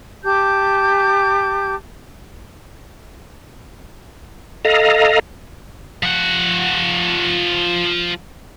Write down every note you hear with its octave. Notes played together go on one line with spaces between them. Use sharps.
G4 A5 D6 G6
A4 D#5 F5 A#5
F3 F#5